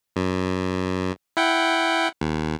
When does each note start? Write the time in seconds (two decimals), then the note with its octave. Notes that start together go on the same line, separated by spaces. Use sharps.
0.16 F#2
1.37 E4 F#5 G5
2.21 D#2